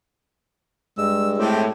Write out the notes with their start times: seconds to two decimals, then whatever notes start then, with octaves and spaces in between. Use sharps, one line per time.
0.98 G2 G#3 E6
1.38 A2 C4 G4